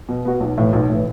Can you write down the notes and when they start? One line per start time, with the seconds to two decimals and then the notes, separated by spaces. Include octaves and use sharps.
0.09 B2
0.25 B3 F#4
0.40 B1
0.58 A2 E3
0.73 B1
0.90 A2 E3